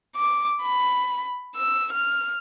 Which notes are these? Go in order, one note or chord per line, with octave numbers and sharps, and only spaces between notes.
D6
B5
E6
F6